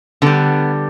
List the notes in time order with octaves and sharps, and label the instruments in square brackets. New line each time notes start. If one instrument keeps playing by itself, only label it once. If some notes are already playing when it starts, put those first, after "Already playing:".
[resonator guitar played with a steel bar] D3 G3 B3